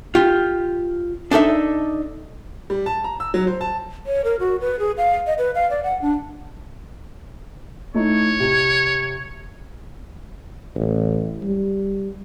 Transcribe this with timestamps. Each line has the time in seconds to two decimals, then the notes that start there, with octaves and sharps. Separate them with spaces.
0.15 F4 G4
1.31 D4 D#4 A4 E5
2.70 G3
2.86 A5
3.04 A#5
3.20 E6
3.34 F#3
3.47 C5
3.61 A5
4.07 C#5
4.24 A#4
4.40 F#4
4.61 B4
4.79 G#4
4.98 F5
5.27 D#5
5.38 B4
5.55 F5
5.70 D5
5.83 F#5
6.02 D4
7.94 A3 D#4 E4 C#5
8.40 C3
10.75 A1
11.43 G3